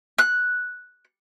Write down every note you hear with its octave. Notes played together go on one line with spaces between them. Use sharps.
F#6